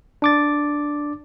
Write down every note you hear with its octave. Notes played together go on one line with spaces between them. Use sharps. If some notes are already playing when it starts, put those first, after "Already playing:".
D4 D6 A6